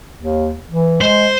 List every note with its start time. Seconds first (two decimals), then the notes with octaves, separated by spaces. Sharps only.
0.18 D#2
0.68 E3
1.01 G#3 C5